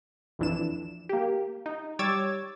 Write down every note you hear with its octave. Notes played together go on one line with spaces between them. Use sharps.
A#1 F2 E3 D4 E7
A#3 G4
D#4
G3 C#5 D6 E6 G#6 A6